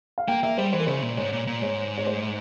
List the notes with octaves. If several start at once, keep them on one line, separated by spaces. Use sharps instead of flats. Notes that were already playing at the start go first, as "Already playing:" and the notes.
F5
A#3 G5
A#3 E5
G3 C5
E3 C5
A#4
C#3 C5
A#2
G#2 C#5
A#2
A#2
G#2 C#5
C#5
C5